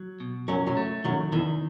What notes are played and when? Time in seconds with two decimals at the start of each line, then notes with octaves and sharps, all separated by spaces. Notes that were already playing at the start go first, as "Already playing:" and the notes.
Already playing: F#3
0.20 B2
0.48 F#2 F#3 C#4
0.67 F#2 F#3
0.77 A3
1.04 F#2 D#3 F#3
1.32 E2 D#3 E3